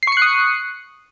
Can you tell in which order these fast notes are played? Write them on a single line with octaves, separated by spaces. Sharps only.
C7 C#6 C#7 F#6 D#6